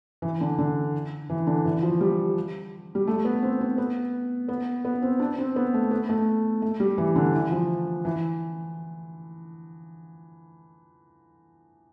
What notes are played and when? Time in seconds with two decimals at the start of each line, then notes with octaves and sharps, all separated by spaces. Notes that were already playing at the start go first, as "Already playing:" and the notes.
0.22 E3
0.41 D3
0.58 D3
1.30 E3
1.47 D3
1.65 E3
1.83 F3
2.01 G3
2.95 G3
3.07 A3
3.25 B3
3.42 C4
3.61 C4
3.78 B3
4.49 B3
4.85 B3
5.02 C4
5.20 D4
5.38 C4
5.56 B3
5.74 A3
5.91 B3
6.09 A3
6.62 A3
6.80 G3
6.98 E3
7.16 D3
7.33 E3
7.51 F3
8.05 E3